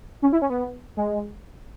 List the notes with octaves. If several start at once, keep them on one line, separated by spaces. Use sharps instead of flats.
C#4
E4
C#4
B3
G#3